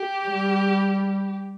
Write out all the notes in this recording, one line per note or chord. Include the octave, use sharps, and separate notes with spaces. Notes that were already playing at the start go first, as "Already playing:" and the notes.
Already playing: G4
G3